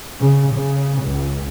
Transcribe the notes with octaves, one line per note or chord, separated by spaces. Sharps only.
C#3
C#3
C#2